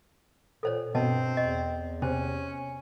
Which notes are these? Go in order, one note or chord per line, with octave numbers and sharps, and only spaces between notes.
A#2 A4 C5 C#5
G2 B2 C4 D#5 A5
E2 D#5
C3 C#4 C5